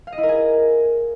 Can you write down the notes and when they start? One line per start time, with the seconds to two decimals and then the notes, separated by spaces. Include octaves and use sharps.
0.07 F5
0.12 D#5
0.18 E4
0.23 A#4
0.29 G#4